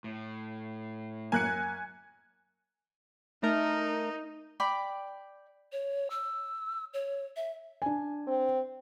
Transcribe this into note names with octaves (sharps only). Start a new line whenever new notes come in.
A2
F#2 A#3 G#5 F#6 C#7
A3 D#4 A#4
D5 G5 B5
C#5
E6
C#5
E5
D4 G#5
C4